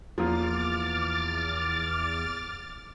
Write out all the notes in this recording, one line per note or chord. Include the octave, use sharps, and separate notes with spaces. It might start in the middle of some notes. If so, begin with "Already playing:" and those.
E2 F3 A#3 F4 D6 F6 A6